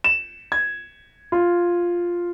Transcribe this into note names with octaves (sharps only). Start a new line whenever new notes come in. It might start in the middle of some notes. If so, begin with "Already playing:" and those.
E7
G#6
F4